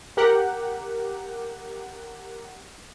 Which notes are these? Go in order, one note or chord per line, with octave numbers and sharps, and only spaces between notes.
G4 A#4 F#5